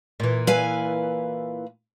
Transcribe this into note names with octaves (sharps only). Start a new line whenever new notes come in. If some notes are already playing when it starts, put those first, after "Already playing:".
A#2 E3
B4 F5 G#5